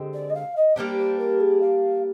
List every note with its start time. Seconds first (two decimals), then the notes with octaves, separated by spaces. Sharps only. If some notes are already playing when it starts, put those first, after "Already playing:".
Already playing: D3 G#3 C4 G4
0.13 D5
0.29 D#5
0.34 F5
0.56 D#5
0.76 G3 A#3 D4 G4 C5
0.98 C5
1.19 A#4
1.40 G#4
1.61 F5